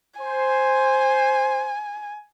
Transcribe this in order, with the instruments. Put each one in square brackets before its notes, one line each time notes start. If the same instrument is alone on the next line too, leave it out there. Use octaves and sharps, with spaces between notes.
[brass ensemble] C5 [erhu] G#5